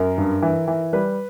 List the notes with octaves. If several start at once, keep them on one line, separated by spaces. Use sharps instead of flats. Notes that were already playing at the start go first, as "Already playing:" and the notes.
Already playing: F#2 A#4
G2
E3
E3
G3 B4